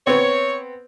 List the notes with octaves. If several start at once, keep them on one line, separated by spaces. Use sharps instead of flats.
B3 C4 C#5